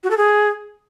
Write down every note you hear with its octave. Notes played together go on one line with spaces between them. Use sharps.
F#4
A4
G#4